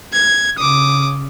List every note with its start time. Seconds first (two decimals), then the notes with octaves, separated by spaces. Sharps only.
0.13 G#6
0.58 C#3 D6 D#6